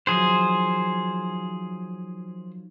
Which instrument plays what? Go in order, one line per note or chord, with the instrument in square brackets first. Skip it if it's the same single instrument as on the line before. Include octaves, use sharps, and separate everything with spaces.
[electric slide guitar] D#3 F3 F#3 [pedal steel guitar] G#4 C5